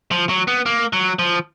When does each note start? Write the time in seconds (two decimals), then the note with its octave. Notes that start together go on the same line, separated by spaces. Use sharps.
0.11 F3
0.29 F#3
0.48 B3
0.66 A#3
0.93 F#3
1.19 F3